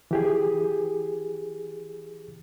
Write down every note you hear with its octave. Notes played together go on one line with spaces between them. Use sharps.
E3 G4 G#4